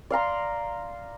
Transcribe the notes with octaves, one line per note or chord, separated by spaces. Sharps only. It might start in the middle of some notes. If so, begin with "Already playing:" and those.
D5 F5 A#5 C6